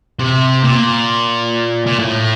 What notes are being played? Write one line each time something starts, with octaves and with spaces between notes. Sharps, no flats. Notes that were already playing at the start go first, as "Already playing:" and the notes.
C3
A#2
A#2
A2